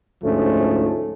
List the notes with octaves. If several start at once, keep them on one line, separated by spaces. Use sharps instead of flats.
D2 G#2 F3 A3 C#4